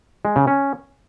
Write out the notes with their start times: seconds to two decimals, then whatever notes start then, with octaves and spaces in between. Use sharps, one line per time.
0.25 G#3
0.36 C#3
0.47 C#4